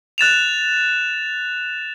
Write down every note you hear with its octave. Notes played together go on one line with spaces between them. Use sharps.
F#6 A6 E7 F7